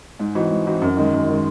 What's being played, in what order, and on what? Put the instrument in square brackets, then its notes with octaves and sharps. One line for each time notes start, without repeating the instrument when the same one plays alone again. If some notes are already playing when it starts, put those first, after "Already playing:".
[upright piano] G#2
E3 C4 D#4 F#4
G#2
E3 C4 D#4 F#4
F#2
D#3 G#3
F#2
D#3 G#3